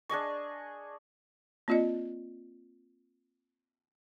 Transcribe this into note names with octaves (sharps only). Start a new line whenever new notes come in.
D4 G#4 D#5 C#6
A#3 C4 F4 D5 D#5